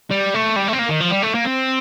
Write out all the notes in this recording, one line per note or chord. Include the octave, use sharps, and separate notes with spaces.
G3
A3
G3
A3
C4
A#3
D#3
F3
G3
A3
A#3
C4